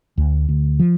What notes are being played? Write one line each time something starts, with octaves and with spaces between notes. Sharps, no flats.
D2
D2
F3